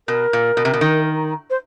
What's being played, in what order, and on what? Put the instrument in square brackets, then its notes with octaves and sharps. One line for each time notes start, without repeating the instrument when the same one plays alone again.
[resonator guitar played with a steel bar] B2 [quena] A#4
[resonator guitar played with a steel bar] A#2
B2
C3
B2
D#3
[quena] C5